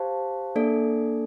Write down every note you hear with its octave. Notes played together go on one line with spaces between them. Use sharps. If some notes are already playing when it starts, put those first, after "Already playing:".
Already playing: G4 C5 F5 A5
A#3 D4 A4 D5